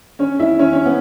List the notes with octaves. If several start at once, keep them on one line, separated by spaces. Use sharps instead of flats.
C#4 C#5
E4 E5
C#4 C#5
C#4 C#5
B3